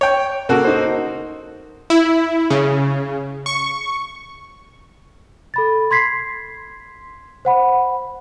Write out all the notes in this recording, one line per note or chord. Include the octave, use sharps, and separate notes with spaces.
C#5 G5
C#3 A#3 F#4 A4
D#4 C5
E4
C#3
C#6
A4 B5 A6
C6 G#6 B6 C7
C5 F#5 B5